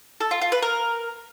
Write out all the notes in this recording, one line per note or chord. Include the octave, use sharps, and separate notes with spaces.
A4
F4
F4
B4
A#4